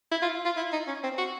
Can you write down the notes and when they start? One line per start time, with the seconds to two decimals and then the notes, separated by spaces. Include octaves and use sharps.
0.12 E4
0.22 F4
0.45 F4
0.57 E4
0.73 D#4
0.87 C#4
1.04 C4
1.18 F#4